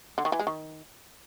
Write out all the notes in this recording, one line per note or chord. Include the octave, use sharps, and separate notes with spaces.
D3
D#3
E3
G#3
D#3